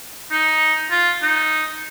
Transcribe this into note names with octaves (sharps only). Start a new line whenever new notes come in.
D#4
F4
D#4